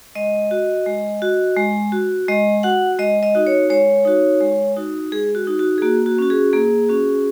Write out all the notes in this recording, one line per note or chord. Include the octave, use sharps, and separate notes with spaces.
G#3 D#5
F#4
G#3
F#4
G#3
F#4
G#3 D#5
F#4 F#5
G#3 D#5
D#5
D#4 F#4
C#5
G#3 C#5
D#4 F#4
G#3
D#4 F#4
G#3 G#4
F#4
D#4 F#4
F#4
G#4
A#3 F#4
F#4
C#4 F#4
G#4
A#3 G#4
C#4 F#4